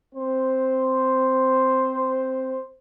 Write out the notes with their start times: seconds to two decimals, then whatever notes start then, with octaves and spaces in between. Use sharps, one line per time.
0.15 C4 C5